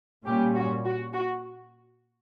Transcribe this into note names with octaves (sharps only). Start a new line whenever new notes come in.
A#2 G3 C#4 G4
F#4
F#4
F#4